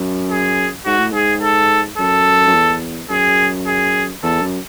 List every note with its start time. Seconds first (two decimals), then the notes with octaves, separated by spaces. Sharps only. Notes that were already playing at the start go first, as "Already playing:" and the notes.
Already playing: F#2
0.30 G#4
0.85 G#2 F#4
0.99 A2
1.12 G#2 G#4
1.42 A4
1.98 F#2 A4
2.47 F#2
2.54 E2
3.10 F#2 G#4
3.66 G#4
4.23 E2 A4
4.42 F#2